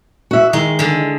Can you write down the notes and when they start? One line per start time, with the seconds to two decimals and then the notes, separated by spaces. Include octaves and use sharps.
0.31 F#4 E5
0.53 D#3 G#3
0.79 D3 G#3